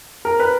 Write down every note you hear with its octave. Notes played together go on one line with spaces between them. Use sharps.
A#4
B4